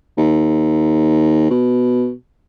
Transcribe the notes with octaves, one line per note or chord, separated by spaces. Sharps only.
D#2
B2